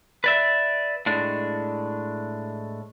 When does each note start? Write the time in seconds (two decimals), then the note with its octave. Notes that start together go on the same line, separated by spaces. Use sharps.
0.24 B4 D5 E5
1.06 A2 G#3 D4